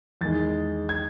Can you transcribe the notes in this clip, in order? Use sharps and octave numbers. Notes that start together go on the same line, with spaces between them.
E2 D#3 G#3 A6
G#6